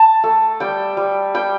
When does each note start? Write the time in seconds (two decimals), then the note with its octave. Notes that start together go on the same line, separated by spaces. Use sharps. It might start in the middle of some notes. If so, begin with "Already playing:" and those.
Already playing: A5
0.23 A3
0.60 G3 G5
0.97 G3
1.34 G3 G5